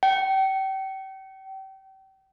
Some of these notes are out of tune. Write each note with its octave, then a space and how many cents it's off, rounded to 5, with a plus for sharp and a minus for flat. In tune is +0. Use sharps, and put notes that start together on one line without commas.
G5 -35